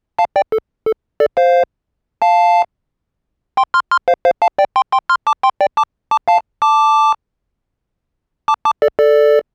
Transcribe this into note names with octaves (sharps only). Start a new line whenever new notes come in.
F5 A5
D5 G5
A4
A4
A4 D5
C5 F5
F5 A5
G5 C6
C6 F6
C6 F6
C5 F5
C5 F5
F5 A5
D5 G5
G5 C6
G5 C6
C6 F6
A5 D6
G5 C6
D5 G5
A5 D6
A5 D6
F5 A5
A5 D6
A5 D6
A5 D6
A4 D5
A4 D5